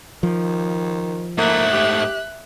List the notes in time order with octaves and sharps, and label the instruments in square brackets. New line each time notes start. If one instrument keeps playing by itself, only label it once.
[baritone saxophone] D#3 [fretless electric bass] F3
[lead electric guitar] G#2 A3 [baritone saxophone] A#3 [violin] E5 F#6
[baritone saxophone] G4